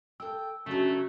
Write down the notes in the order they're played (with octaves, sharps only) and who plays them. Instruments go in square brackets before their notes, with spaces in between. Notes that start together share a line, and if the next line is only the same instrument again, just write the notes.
[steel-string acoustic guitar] A4 G5 [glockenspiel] E6
[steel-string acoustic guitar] C#3 D4 [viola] F#3 [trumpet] A3